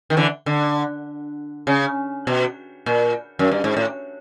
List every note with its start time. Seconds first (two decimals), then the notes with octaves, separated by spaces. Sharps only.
0.10 D#3
0.17 D3 E3
0.46 D3
1.67 C#3
2.27 B2
2.86 A#2
3.39 F#2
3.52 G2
3.64 G#2
3.77 A2